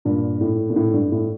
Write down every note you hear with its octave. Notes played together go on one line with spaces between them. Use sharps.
G2 A#2
A2
A#2
A2
G2
A2